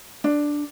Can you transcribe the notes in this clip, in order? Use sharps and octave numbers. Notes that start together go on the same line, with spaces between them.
D4